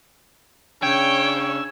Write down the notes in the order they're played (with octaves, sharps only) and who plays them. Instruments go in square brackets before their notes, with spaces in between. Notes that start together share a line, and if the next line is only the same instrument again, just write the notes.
[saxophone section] C#3 C#4 D4 [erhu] C#5 [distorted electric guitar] G5 [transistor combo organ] G#5 E6